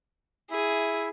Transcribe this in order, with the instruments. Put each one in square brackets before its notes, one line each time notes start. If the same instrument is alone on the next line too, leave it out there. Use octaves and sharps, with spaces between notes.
[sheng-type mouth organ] E4 E5 [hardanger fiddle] G#4